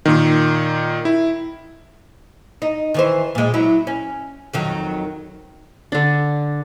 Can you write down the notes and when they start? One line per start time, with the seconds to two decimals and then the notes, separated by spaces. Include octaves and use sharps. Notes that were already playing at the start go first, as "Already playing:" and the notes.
0.05 A#2 D#3
1.05 E4
2.62 D#4
2.94 D#3 E3 C5
3.35 A#2 G#3
3.54 F#3 E4
3.87 C#4
4.53 F2 D#3 F#3
5.92 D3 D4